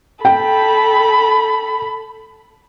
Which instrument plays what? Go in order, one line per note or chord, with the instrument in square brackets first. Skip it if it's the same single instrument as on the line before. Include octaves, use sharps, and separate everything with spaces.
[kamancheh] A4 B5 [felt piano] G5